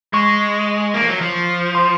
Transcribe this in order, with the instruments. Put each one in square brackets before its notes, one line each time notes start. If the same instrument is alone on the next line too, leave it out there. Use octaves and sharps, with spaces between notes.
[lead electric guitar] G#3 [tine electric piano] C#6
[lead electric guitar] A#3
F3
F#3
F3
[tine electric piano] C6